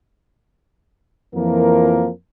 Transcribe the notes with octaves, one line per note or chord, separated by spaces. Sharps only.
F2 E3 F3 A#3 A#4